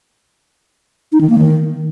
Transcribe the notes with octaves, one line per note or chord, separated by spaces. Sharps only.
D#4
D#3
A#3
D#3